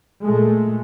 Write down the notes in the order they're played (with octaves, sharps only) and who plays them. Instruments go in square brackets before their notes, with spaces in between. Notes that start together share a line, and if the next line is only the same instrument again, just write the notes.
[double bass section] A#2 G#3 A3